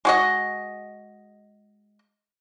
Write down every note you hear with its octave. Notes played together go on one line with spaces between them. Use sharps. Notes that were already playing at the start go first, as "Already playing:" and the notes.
G#3 F#4 D#5